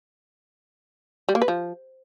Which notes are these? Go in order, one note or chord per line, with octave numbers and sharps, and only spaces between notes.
G3
A#3
B4
F3